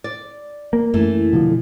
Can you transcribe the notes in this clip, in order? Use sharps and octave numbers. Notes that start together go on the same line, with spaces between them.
D5
A#3
F#2 E3 A3
B2 D3 F3